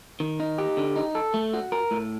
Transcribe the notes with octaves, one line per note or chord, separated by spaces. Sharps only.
D#3
D#4
G4
D3
D#4
A4
A3
F#4
A#4
A2